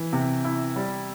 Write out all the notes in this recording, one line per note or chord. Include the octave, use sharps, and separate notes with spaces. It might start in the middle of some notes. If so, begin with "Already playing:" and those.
Already playing: E3
C3
E4
G3